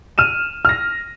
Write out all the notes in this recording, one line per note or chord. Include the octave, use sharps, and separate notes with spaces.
F6 D#7 E7
F6 A#6